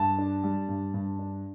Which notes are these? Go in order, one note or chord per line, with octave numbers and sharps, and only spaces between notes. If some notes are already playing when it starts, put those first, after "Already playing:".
Already playing: G2 A5
D4
G3
G2
G2
D4